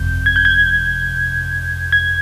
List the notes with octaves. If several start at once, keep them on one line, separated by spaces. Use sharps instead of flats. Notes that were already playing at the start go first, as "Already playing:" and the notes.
Already playing: G1 F2 C3 G6
G#6
G6
G#6
G#6